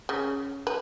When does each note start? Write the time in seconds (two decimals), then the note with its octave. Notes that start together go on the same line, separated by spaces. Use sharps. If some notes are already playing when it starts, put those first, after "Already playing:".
0.09 C#3
0.67 B4